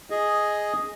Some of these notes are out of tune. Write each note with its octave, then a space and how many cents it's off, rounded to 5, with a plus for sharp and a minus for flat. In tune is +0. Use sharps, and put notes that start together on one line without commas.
G#4 +0 D#5 +0